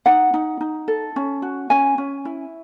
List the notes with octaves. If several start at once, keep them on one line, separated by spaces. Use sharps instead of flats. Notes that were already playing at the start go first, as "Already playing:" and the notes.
D#4 F#5
D#4
D#4
A4
C#4
F#4
C#4 G#5
C#4
E4